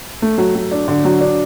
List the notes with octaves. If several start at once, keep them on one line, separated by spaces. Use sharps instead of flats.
A3
F#3
F#3
D4
D3
F#3
D4